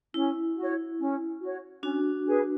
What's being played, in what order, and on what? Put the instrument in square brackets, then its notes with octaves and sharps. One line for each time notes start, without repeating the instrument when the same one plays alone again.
[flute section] C#4 [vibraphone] E4
[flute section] F#4 C#5
C#4
F#4 C#5
[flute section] C#4 [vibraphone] D4 F#4
[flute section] G#4 B4